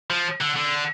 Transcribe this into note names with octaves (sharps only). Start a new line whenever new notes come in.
F3
D3
D3